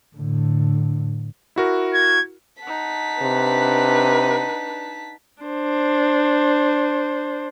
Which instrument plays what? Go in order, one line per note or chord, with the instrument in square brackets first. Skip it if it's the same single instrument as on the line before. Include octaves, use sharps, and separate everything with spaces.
[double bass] A2 D3
[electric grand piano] E4 F#4 A#4
[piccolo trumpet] G#6
[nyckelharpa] D#4 F#5 [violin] A5 B6
[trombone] C3 [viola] D4 B4
[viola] D4 C5